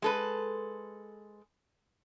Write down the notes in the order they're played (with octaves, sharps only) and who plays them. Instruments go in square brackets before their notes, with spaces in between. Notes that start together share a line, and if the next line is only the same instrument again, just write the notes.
[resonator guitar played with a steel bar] G#3 A4 B4